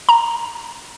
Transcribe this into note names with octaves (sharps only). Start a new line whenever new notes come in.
A#5